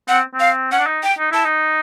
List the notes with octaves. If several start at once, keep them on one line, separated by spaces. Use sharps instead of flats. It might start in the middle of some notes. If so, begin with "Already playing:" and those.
C4 F#5
C4
F5
C#4 F#5
D4
D#4
G5
D#4
E4 A5
D#4